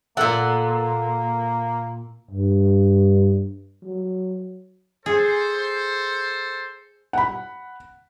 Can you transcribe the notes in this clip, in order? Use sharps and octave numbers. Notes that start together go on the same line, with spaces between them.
A#2 A#3 A4 F#5
G2
F#3
G#4 A4 C5
F#5 B5